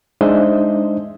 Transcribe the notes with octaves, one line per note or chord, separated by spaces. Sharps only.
G#3 D4 D#4 C5 D#5 E5